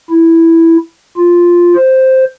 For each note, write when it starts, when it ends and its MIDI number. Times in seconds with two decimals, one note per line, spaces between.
0.10 0.77 64
1.17 1.75 65
1.75 2.24 72